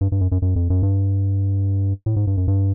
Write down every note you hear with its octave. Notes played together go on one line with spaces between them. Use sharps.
G2
G2
F#2
F#2
F#2
F2
F#2
G2
A2
G#2
G2
F#2
G2